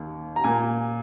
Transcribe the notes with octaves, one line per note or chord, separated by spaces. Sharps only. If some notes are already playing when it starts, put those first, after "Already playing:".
Already playing: D#2 D#3 A#3
A#5
A#2 A#3 G#5